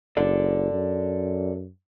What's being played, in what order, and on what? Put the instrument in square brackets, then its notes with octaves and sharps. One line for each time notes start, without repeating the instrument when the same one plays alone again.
[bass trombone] F#1 [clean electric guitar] A4 D5
[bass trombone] F#2